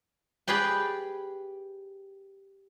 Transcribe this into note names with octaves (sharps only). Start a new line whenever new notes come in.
G4 G#4 B4 D5 G5